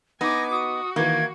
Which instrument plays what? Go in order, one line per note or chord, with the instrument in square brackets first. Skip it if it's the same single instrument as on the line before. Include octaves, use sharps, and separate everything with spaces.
[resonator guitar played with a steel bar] B3 D#4 [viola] G#5 D6 [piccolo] A#6
[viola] F#4 [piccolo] D#6
[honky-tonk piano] D#3 E3 [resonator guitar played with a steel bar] A#3 [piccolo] G#6